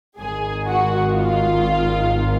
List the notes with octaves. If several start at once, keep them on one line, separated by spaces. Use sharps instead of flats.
G#1 G#2 D#3 G#3 G#4 G#5
F#4 F#5
F4 F5